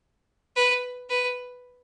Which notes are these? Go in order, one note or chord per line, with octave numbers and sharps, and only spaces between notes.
B4
B4